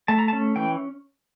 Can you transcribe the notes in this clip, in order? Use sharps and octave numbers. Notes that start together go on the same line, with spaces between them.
A3 A5
A#5
A5
C#4
E3 G5